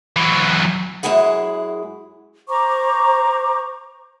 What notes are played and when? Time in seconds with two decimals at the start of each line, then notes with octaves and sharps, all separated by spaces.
0.16 E3 F#3
1.03 F#2 G#3 E4 G#4 F#5
2.48 C5 A#5 C#6 D6